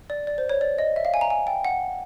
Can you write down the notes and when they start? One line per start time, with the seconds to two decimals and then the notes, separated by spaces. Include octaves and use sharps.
0.10 D5
0.27 D5
0.38 C5
0.49 C#5
0.61 D5
0.78 D#5
0.96 E5
1.05 F5
1.14 G#5
1.21 A#5
1.30 G#5
1.47 G5
1.65 F#5